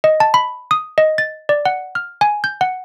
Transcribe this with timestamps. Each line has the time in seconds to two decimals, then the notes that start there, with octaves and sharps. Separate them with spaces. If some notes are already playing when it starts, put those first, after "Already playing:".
0.04 D#5
0.20 A5
0.34 B5
0.71 D#6
0.98 D#5
1.18 A6
1.49 D5
1.65 F#5
1.95 F6
2.21 G#5
2.44 G6
2.61 F#5